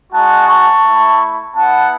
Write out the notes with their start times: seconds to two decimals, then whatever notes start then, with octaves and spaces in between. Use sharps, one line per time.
0.12 G#3 D#4 F#4 F#5 A5
0.48 A5 C#6
0.83 A3 E4
1.55 B3 E4 F#5 A5